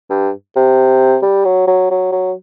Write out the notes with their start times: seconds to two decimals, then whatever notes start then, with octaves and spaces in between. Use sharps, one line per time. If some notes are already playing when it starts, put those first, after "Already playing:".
0.10 G2
0.56 C3
1.22 G3
1.45 F#3
1.67 F#3
1.91 F#3
2.12 F#3